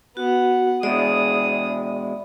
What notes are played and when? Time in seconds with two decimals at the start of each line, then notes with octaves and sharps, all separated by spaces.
0.17 B3 F#4 F#5
0.83 B2 G#3 G#4 D5 E5 B5 D#6